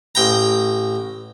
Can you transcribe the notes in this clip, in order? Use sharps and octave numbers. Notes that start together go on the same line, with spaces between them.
A1 G5 A#5